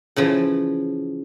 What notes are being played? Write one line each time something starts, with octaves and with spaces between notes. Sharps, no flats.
C#3 E3 F3